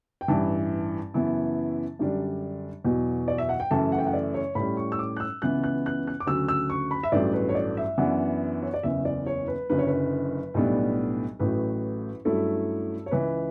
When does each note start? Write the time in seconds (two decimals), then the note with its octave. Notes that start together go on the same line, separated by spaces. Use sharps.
0.21 G5
0.28 A1 G2 E3 A5
1.14 F#2 C#3 E3 B3 E4
1.99 F#2 D3 G3 D4
2.84 E2 B2 F#3
3.28 D5
3.38 E5
3.49 F#5
3.60 G5
3.71 F#2 C#3 E3 A3 A5
3.92 F#5
3.98 G5
4.06 F#5
4.13 D5
4.34 C#5
4.55 A2 G3 C#4 B5
4.77 C#6
4.92 E6
4.99 D6
5.17 F#6
5.20 E6
5.42 C#2 C#3 E3 B3 F#6
5.64 F#6
5.86 F#6
6.07 F#6
6.20 D6
6.27 D2 C#3 F#3 E6
6.48 E6
6.70 C#6
6.91 B5
7.03 E5
7.12 A1 G2 F#3 A3 D5
7.33 B4
7.49 C#5
7.55 D5
7.77 E5
7.98 F#2 E3 B3 D4 F#5
8.62 C#5
8.74 D5
8.83 F#1 E2 C#3 E5
9.05 D5
9.26 C#5
9.48 B4
9.70 F#1 F#2 D3 B4
9.78 C#5
9.87 B4
10.54 B1 A2 G3 B3 D4
11.39 A1 A2 F#3 B4
12.25 G2 F#3 A3 C#4 E4 A4
13.06 C#5
13.11 C#2 C#3 E3 B4